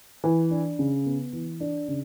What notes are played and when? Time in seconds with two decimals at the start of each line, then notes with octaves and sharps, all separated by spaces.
0.24 E3
0.51 D4
0.79 C#3
1.06 B3
1.33 E3
1.60 D4
1.88 C#3